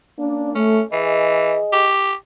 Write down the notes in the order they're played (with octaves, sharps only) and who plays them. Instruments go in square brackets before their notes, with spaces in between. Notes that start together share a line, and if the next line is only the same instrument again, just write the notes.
[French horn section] A#3 C#4 D4
[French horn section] A3 [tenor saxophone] C#4
[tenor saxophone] E3 [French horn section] G#4 D#5
[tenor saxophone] G4